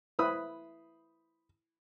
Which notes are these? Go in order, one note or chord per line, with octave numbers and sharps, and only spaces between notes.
E4 B4 C5 B5 D#6